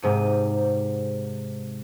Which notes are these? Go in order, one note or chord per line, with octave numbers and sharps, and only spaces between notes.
G#2 C3 D#7